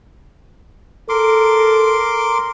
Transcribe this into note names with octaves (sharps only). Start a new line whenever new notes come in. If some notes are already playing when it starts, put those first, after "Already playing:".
A4 A#4 C6 D6